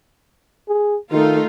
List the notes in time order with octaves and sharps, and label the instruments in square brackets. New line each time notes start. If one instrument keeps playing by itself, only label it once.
[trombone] G#4
[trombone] D#3 [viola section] A3 D#4 F4